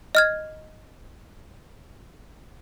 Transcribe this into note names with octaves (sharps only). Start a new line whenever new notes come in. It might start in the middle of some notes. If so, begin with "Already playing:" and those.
D#5 F6 G#6